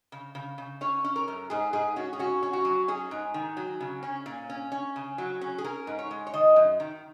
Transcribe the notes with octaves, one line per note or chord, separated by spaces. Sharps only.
C#3
C#3
C#3
C#4 C#5
C#4
A#4
F#2
G#2 G#4
G#2 G#4
C#4 F#4
G#4
C#4 F#4
C#4
F#4
F#3
C#4 G#4
G#2
D#3
F#3
C#3
C#4
A#2
C#4
C#4
C#3
F#3
C#4
G#4
C#4 A#4
G#2
C#5
G#3
C#5
D#3 D#5
F#2
D#3